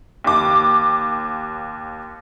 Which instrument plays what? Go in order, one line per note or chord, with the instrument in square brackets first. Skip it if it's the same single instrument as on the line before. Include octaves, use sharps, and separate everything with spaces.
[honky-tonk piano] D#2 D6